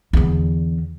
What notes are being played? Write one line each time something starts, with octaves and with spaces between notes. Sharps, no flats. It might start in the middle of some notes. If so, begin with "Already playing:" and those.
E2 D3